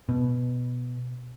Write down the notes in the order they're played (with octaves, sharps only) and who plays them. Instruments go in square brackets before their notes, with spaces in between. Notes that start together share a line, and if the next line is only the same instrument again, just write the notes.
[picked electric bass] B2